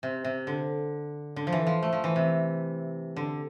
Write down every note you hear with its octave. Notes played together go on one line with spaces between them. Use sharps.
C3
C3
D3
D3
F3
E3
F3
A3
F3
E3
C3
D3